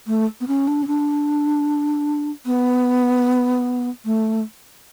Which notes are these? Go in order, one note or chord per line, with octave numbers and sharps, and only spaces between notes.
A3
B3
C#4
D4
C#4
D4
B3
A3